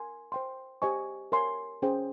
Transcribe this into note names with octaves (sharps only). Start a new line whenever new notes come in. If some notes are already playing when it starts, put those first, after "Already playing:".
Already playing: A#4 G#5 C6
C5 G5 C6
G4 C5 D#5 G#5 C#6
A#4 C#5 G#5 C6
C#4 G#4 C5 G5